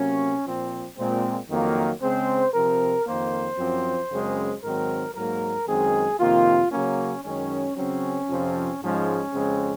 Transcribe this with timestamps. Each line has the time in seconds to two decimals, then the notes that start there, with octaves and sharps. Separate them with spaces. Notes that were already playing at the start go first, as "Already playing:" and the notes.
Already playing: C3 F#3 A#3 C#4
0.45 A#2 F3 C4
0.96 A#2 G#3 C4
1.49 F2 D#3 F#3 A#3
2.01 C#3 G#3 C4 C5
2.53 C3 F3 C4 A#4
3.06 F2 D#3 A#3 C5
3.57 F#2 F3 C4
4.11 F#2 C#3 G#3 C4
4.62 G#2 D#3 F#3 C4 A#4
5.15 G#2 F#3 A#3 A#4
5.67 F#2 D#3 G#3 C4 G#4
6.19 F2 C3 D#3 A#3 F4
6.71 C#3 F#3 A#3 C#4
7.24 F#2 D#3 G#3 C#4
7.76 C#3 F#3 C4 C#4
8.29 F2 C3 F3 C4
8.81 G#2 F3 G#3 C#4
9.33 F2 C#3 G#3 C4